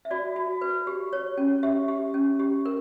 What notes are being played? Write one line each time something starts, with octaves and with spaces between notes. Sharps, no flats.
E5
F#4 D5
F#4
B4
G4
C#5
C#4
G4 E5
G4
C#4
G4
A#4